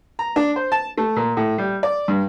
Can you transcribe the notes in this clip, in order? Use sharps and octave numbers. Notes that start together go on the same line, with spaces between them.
A#5
D4
C5
A5
A3
A#2
A2
G3
D5
G2